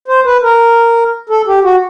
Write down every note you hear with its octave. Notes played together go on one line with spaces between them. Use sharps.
C5
B4
A#4
A4
G4
F#4